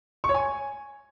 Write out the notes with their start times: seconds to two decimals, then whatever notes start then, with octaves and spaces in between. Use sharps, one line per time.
0.24 C#6
0.29 C#5
0.34 G#5